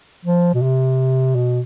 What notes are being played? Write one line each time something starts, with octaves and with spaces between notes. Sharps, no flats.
F3
B2
C3
B2